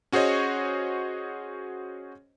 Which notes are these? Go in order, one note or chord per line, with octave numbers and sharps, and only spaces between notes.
C#4 F#4 G#4 C5 C#5 D#5